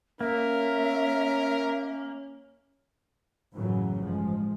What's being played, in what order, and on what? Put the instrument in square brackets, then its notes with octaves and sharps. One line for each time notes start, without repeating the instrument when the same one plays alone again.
[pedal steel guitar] A#3 [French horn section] C#4 [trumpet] A#4 [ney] E5
[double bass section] F#2 A2 C#3 E3 F#3
A1 G2 F3 G#3